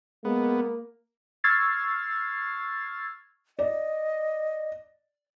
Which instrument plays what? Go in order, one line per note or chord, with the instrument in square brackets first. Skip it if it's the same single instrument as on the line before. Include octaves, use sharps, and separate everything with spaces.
[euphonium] G#3 [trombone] A#3 [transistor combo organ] B3
[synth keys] C#6 E6 F6 G#6 A6 C7
[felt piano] D5 [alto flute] D#5